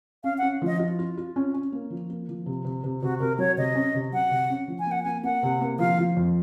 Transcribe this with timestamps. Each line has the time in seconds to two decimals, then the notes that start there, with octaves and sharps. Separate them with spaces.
0.24 C#4 F5
0.38 C#4 F#5
0.62 F3 D#5
0.79 F4
0.99 F4
1.17 F4
1.36 C#4
1.54 C#4
1.72 A#3
1.90 F3
2.10 A#3
2.28 F3
2.46 C3
2.65 C3
2.83 C3
3.01 C3 F#4
3.20 C3 A#4
3.39 F#3 C#5
3.57 C3 D#5
3.75 C#4
3.94 C3
4.12 F#3 F#5
4.31 C3
4.50 C#4
4.68 F3
4.79 G#5
4.87 A#3 F#5
5.03 A#3 G#5
5.23 A#3 F#5
5.43 C3
5.61 A#3
5.79 F3 F5
5.98 F3
6.16 F2